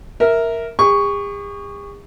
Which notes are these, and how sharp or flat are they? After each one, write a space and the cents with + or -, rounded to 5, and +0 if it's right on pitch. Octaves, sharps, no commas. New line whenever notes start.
A#4 +0 E5 -10
G#4 -45 C#6 +5